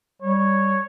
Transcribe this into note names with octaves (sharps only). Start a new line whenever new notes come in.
G3 C#5